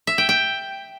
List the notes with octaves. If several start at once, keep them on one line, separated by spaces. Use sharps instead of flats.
E5
G5
G5